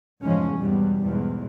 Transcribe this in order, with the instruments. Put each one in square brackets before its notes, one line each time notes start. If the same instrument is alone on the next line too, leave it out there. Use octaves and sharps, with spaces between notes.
[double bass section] F1 E2 G#2 F3 G#3 C#4
E2 G#2 B2 G3
B1 E2 G#2 B2